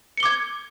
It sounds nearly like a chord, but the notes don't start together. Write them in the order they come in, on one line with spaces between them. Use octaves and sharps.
C#7 G7 D6 G#6